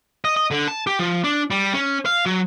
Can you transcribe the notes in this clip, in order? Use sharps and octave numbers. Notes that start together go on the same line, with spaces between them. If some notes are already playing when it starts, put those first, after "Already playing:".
D#5
D#5
D3
A5
G4
F3
D4
G3
C#4
F5
F#3